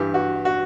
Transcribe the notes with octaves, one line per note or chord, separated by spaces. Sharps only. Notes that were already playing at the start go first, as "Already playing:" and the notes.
Already playing: G2 E3 G4
F#4
F#4